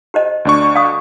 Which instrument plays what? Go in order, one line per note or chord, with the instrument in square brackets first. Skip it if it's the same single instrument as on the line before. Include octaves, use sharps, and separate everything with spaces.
[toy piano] G4 C5 D#5
[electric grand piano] D2 D4 C#6
[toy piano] F5 D#6